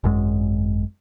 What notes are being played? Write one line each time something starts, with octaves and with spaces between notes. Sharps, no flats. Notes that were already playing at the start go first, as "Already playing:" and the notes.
G#1 F#2 G#3